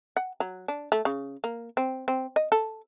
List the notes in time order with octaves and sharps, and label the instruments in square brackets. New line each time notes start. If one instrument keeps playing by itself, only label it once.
[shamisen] F#5
F#3
D4
A3
C#3
A#3
C4
C4
D#5
A4